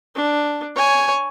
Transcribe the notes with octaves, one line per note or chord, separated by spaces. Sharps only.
D4
C#5 G#5